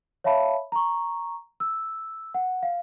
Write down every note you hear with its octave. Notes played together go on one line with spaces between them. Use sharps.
C#5 E5 F5 A5 B5
A#5 C#6
E6
F#5
F5